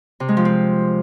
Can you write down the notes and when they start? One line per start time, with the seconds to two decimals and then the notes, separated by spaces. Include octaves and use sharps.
0.20 C3
0.28 G#3
0.37 F3
0.45 C4